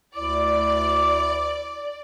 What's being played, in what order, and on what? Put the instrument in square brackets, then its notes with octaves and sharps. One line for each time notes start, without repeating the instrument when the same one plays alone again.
[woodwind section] D2 E4 D6 [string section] D5